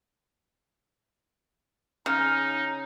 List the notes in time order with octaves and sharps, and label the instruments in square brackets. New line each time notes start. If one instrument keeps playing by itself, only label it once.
[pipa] C#3 [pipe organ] D#4 [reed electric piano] F6